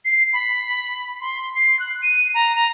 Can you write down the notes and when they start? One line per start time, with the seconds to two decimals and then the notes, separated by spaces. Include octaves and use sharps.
0.05 C7
0.33 B5
1.21 C6
1.55 C7
1.79 F#6
2.02 D#7
2.34 A#5
2.56 A#5